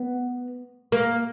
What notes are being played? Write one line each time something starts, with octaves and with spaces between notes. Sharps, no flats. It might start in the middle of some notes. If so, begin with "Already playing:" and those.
Already playing: B3
A#3